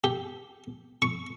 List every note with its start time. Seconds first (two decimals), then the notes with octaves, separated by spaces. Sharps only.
0.04 G4
1.02 C#6